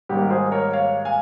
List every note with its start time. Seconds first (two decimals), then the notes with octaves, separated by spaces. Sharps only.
0.09 G#2 D#3 G3 A#3 G4
0.30 G#4 C5
0.52 A#4 C#5
0.73 C#5 F5
1.05 F5 G#5